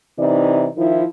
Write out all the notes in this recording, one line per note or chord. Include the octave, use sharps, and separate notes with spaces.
C3 E3 D#4 D5
D#3 F3 E4